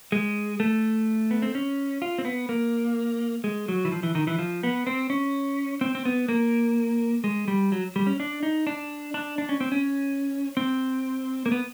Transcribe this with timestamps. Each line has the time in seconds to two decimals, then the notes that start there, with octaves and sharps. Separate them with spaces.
0.12 G#3
0.60 A3
1.31 B3
1.42 C4
1.55 C#4
2.02 F4
2.18 C4
2.25 B3
2.49 A#3
3.44 G#3
3.68 F#3
3.85 E3
3.92 F3
4.03 E3
4.15 D#3
4.27 E3
4.39 F3
4.63 B3
4.87 C4
5.10 C#4
5.81 C4
5.95 C4
6.05 B3
6.28 A#3
7.24 G#3
7.48 G3
7.72 F#3
7.96 G3
8.07 C#4
8.20 D4
8.43 D#4
8.67 D4
9.14 D4
9.38 D4
9.49 C#4
9.61 C4
9.72 C#4
10.57 C4
11.46 A#3
11.52 B3